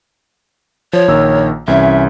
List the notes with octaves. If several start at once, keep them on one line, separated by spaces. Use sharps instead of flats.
F3 C#5
A#1 D#3 E6
C2 E3 C#4 E5